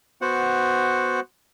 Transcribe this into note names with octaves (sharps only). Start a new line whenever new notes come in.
B3 F#4 C5 F#5